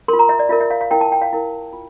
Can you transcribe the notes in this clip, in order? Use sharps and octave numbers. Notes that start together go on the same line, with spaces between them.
F4 A#4 C6
A#5
E5
D5
F4 A#4 E5
E5
F5
F5
E4 A#4 G5
A5
G5
F5
E4 A#4
F4